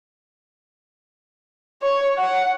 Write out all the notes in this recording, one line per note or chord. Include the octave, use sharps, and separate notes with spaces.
C#5
F#5